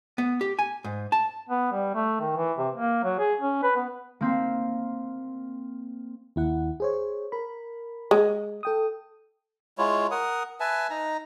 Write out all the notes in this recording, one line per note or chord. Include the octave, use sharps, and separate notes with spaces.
B3
G4
G#5
G#2
A5
B3
G3
A3
D#3
E3
C3
A#3
F#3
G#4
C#4
B4
B3
A#3 C4
D#2 E4 F#5
G#4 C5 C#5
A#4 B5
G#3
A4 G5 D#6
G#3 E4 F4 C#5
A#4 F#5 D#6
B4 E5 G#5 A5
D#4 A#5